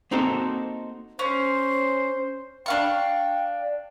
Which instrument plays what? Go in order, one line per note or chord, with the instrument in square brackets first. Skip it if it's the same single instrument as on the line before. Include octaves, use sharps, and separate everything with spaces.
[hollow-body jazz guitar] A#3 C4 D#4 F#4 A4 C5
[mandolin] C#4 [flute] C5
[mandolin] D4 F5 C#6 [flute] G5